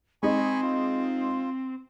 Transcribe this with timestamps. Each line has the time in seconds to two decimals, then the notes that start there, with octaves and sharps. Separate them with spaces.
0.23 G#3 C4 D#4 G#5 B5 C#6
0.63 F4